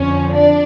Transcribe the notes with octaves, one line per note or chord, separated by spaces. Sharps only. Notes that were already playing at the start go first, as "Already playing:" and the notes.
Already playing: F2 D3 F3 C#4 C#5
D4 D5